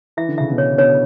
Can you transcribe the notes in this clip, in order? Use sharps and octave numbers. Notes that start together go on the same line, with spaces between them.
E3 E5
D3
C#3 E5
B2 D3
C#5
B2 D3 C#5